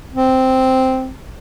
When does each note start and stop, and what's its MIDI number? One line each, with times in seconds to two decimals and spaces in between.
0.13 1.11 60